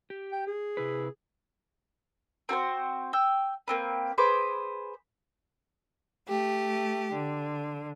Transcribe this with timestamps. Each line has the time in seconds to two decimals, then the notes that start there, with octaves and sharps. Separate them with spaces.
0.10 G4
0.32 G5
0.47 G#4
0.77 C3 E4 B4
2.49 C4 F#4 A4 C5
3.13 G5 E6
3.68 A#3 C4 B4
4.18 G#4 B4 C5 D6
6.28 A3 G4
7.10 D3